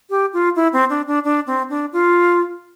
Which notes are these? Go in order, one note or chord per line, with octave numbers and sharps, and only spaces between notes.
G4
F4
E4
C4
D4
D4
D4
C4
D4
F4